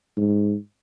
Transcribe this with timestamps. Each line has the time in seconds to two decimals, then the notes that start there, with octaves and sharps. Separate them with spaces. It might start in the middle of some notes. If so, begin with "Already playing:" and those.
0.17 G#2